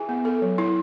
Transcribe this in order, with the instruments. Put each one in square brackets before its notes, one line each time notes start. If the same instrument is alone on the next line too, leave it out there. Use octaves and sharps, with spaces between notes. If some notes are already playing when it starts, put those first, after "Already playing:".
Already playing: [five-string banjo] E3 [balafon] G#4
[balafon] B3
A4
F#3
E4